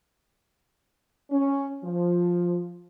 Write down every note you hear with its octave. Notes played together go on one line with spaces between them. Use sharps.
C#4
F3